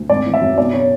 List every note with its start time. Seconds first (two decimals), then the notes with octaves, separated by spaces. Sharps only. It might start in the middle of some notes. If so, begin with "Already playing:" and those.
Already playing: D2
0.09 G#1 D5
0.26 E3
0.34 E5
0.41 F#2
0.58 B1 D5
0.73 F#3 C#5